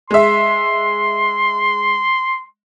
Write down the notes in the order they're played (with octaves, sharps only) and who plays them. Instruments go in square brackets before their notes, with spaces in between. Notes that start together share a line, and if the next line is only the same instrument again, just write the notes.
[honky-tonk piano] G#3 E5 [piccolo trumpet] C6